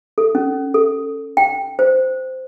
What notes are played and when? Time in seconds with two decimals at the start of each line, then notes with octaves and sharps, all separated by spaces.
0.18 A4
0.35 C#4
0.74 A4
1.37 G5
1.79 C5